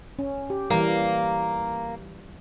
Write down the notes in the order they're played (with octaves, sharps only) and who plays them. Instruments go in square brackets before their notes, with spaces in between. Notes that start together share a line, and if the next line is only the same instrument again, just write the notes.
[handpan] C#4
G4
[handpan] E3 G3 [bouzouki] A#3